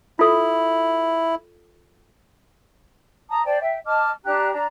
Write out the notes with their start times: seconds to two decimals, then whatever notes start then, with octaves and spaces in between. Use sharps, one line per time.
0.19 E4 F4 A4
3.29 A5 A#5 D#6
3.44 C5 D5 G5 A5
3.60 E5 G5
3.85 D#5 A5 D6 F6
4.24 D4 G4 A#5 F#6
4.52 D4 A5 A#5